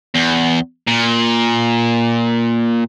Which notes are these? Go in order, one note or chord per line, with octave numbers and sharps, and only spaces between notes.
E2
A#2